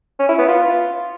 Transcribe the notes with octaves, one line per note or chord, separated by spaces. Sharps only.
C#4
E4
B3
F4